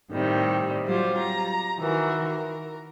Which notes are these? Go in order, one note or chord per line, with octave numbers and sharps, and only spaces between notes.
A2 C3 D#3 G3
F#3 G3 F4 C5
A#5
D#3 E3 F#4 A#4
A#4